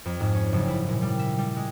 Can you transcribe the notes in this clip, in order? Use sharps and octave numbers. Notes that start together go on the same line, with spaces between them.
F2
G#2
C#4
F#1
E4
A#2
G3
E5
G3
G#3